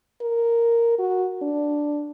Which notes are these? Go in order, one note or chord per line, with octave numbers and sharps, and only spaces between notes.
A#4
F#4
D4